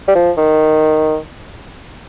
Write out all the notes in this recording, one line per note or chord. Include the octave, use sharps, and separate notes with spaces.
G3
F3
D#3